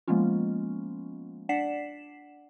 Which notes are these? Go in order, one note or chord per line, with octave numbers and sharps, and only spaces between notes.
F3 G#3 A#3 B3 C#4 F4
D4 D5 F#5 B6 C7 E7